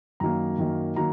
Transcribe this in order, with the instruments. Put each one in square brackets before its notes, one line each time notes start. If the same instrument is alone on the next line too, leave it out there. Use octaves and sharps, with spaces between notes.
[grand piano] F#2 D#3 F#3 A#3 A#5
F#2 D#3 F#3 A#3
D#3 F#3 A#3 A#5